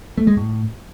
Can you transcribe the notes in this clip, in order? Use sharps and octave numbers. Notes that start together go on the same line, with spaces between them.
A3
G#3
A2